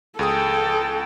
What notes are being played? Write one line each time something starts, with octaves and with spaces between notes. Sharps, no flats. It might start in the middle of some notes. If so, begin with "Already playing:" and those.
C#2 G#4 A4 G5 D#6